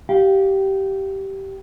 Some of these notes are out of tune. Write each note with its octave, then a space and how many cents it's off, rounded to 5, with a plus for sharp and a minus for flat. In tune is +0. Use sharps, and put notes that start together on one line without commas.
G4 -15 F5 +0